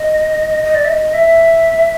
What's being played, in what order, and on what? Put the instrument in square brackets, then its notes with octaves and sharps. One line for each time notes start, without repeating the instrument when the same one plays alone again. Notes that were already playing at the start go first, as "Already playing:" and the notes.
Already playing: [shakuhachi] D#5
D#5
D5
E5
D#5
E5